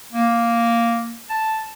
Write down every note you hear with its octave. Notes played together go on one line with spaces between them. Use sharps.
A#3
A5